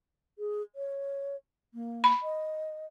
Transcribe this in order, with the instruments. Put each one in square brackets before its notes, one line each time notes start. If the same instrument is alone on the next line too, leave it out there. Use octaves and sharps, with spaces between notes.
[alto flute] G#4
C#5
A#3
[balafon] B5
[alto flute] D#5